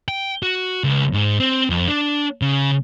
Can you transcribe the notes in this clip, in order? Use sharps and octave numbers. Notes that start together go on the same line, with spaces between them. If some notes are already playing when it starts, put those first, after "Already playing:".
G5
F#4
C#2
G#2
C4
F2
D4
C#3